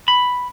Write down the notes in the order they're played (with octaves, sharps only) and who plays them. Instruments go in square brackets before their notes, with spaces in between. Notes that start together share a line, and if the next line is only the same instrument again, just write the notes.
[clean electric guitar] B5